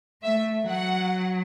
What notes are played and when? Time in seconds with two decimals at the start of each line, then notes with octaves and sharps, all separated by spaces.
0.24 A3 E5
0.68 F#3 F#5